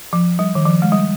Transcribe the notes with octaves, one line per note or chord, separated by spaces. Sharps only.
F3
G3
D#3
F3
G#3
G3